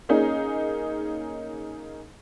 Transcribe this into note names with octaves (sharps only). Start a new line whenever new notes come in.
A#3 C#4 D#4 G#4